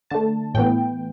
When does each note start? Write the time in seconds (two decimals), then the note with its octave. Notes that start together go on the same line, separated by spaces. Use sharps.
0.10 D3 A3 A5
0.54 A2 E3 B3 G5